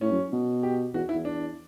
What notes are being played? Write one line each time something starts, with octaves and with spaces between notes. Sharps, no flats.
A2 C#4
F#2
B2
G4
E2 F#4
E4
E2
D4